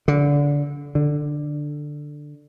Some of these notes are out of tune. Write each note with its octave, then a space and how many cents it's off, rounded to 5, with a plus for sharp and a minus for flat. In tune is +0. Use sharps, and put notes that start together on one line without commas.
D3 -25
D3 +10